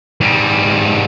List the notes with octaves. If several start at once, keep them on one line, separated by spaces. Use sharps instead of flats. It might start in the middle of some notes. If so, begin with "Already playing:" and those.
G#2 G3